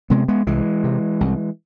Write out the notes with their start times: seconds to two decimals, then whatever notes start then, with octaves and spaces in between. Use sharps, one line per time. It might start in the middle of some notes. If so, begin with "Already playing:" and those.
0.10 C3 G#3 B3
0.28 G#3 B3
0.47 C2 E3 G#3
0.84 C3
1.21 C2